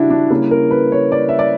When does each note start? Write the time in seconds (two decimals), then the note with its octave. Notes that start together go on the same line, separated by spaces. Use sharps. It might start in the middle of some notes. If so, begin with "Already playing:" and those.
Already playing: C#3 G3 D4 E4 F#4 G4
0.10 D4
0.30 C#3 G3 A#3 E4
0.51 A#4
0.71 B4
0.92 C#5
1.12 D5
1.29 E5
1.39 D5